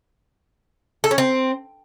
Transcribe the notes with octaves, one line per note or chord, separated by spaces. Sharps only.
A4
C#4
C4